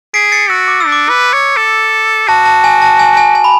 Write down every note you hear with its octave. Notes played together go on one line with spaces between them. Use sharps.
G#4 B6 D7
A6 C#7
F#4 E6
D6
E6
D4
D6
B4
C#5
A4
F#4 A5
A5
G#5
A5
G#5
G#5
G#5
B5